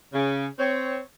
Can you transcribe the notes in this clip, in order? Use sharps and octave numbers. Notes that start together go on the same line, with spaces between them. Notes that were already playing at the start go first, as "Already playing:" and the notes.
C#3
C4 C#5